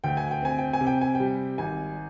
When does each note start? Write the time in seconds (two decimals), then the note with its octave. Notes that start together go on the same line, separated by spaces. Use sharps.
0.04 D2 G5
0.17 G#5
0.31 G5
0.42 C4 G#5
0.59 G5
0.73 G#5
0.81 C3
0.87 G5
1.01 G#5
1.15 G5
1.20 G3
1.58 G#1 G#5